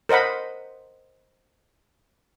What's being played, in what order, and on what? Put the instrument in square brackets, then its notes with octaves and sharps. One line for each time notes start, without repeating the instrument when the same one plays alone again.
[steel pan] A#4 C5 D#5 F#5 B5